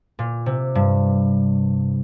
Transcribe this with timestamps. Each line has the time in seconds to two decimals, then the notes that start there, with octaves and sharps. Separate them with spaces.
0.19 A#2
0.46 C3
0.75 G2